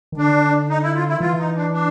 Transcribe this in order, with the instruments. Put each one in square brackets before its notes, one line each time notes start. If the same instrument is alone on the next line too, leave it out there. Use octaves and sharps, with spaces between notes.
[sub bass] D#3
[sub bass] D3 [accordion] D4
[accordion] D#4
E4
F4
E4
[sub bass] D#3
[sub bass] E3 [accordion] F4
[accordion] D#4
D4
D4